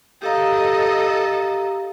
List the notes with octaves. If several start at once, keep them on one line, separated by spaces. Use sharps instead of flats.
G4 A4 D#5 F5 A#5